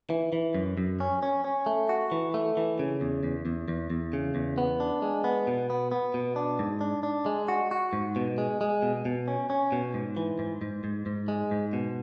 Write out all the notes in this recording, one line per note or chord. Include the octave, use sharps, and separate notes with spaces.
E3
E3
F#2
F#2
C#4
C#4
C#4
A3
F#4
E3
A3
E3
C#3
E2
E2
E2
E2
E2
C#3
E2
B3
D4
G#3
B3
B2
B3
B3
B2
D4
G#2
D4
D4
G#3
F#4
F#4
G#2
B2
G#3
G#3
B2
B2
C#4
C#4
B2
G#2
E3
G#2
G#2
G#2
G#2
G#3
G#2
B2